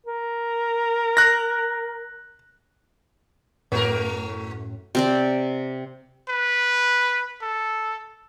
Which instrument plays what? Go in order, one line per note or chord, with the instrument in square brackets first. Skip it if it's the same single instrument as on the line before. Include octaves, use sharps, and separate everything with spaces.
[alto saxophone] A#4
[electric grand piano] F#6 A#6
[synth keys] F#2 A2 [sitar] A3 A#4
[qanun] C3 C4 D5
[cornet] B4
A4